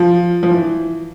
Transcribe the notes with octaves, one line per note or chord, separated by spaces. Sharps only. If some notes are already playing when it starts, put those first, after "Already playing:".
Already playing: F3
F3
E3